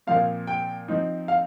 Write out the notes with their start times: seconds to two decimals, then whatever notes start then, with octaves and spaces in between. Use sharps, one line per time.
0.07 A#2 F3 C4 F5
0.47 G5
0.88 F3 C4 D#4
1.28 F5